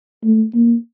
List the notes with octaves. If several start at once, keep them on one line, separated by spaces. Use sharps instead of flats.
A3
A#3